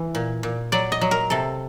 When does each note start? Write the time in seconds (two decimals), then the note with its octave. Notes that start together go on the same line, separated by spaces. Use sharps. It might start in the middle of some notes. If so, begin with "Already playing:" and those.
Already playing: E3
0.15 A#2
0.43 A#2
0.72 F#3 D5
0.92 D#5
1.01 F#3
1.11 A#4
1.30 C3 A4